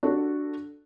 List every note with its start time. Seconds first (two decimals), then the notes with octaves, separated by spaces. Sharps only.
0.03 D4 F#4 G4 A4